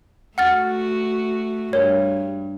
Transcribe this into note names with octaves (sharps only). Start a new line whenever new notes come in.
A3 F#4 F#5 F6 A6
G2 A#4 C#5